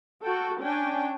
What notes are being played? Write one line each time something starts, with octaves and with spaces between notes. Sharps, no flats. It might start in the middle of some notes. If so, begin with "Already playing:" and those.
F#4 A4 G5
C#4 D4 G5 G#5